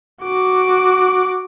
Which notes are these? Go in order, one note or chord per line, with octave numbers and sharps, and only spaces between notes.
F#4 D6